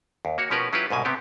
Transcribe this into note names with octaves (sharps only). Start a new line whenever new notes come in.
D#2
A#3 F#4 C#5
B2 F3 C#4 G4 A#4 B4
F#3 C#4 E4 F4 G4 B4
C2 G#2 B2 G#5
C3 B3 C4 G4